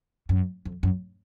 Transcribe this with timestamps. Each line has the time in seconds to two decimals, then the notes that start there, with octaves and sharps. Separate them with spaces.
0.29 F#2
0.65 F2
0.83 F#2